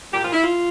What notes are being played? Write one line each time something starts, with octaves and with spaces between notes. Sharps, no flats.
A#2 G4
F4
E4
F4